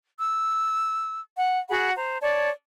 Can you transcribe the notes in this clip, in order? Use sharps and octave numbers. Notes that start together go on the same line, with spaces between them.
E6
F#5
F#4 G#4 F#5 B5
C5 A#5
C#5 D5 A5